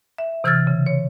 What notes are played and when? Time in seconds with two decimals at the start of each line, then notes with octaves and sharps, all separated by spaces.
0.18 E5
0.44 C3 E3 E6 F6 G#6 A6
0.67 C#3
0.87 C#5